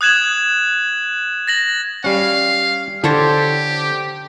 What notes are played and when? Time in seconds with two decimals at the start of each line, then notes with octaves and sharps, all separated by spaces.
0.01 D#6 F#6 G#6 E7 F#7
1.47 A6 A#6 F#7
2.04 G3 C#4 F5
3.04 D3 G4 A4 C5 C#5